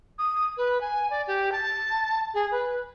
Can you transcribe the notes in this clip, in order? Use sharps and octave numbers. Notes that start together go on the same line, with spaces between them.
D#6
B4
G#5
D5
G4
A5
G#4
B4